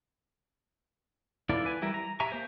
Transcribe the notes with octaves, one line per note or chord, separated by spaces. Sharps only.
E3 E4 F4 A4 D5
B4 G#5
E3 G3 E4 A#4
A#5
G4 E5 G#5 A#5 C#6
A#3 C5